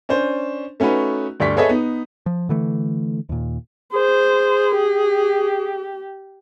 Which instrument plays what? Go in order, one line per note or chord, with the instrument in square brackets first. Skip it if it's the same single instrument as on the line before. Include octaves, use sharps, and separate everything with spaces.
[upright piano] C#4 D4 C5
A3 C#4 D#4 F#4 B4
D2 G2 D5 C#6 B6
G#4 A4 B4 C#5 D#5 E5
B3 D#4
[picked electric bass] F3
D3 E3 A3
D#2 A#2
[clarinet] G#4 [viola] C5
[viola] G4